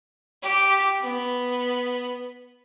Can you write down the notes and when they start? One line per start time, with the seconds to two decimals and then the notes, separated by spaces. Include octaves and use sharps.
0.43 G4
1.01 B3